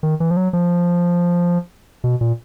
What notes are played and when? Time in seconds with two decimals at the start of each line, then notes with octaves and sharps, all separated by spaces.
0.03 D#3
0.20 E3
0.31 F3
0.37 F#3
0.53 F3
2.04 B2
2.21 A#2